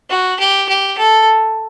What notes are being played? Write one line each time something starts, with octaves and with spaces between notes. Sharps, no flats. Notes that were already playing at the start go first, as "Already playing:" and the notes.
F#4
G4
G4
A4